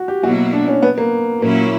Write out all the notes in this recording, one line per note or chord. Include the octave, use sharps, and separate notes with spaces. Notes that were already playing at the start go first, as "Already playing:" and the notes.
Already playing: F#4
G4
B2 F#3 A#3 E4 F#4
D4
C#4
B3
A#3
A#2 F#3 A#3 C#4 E4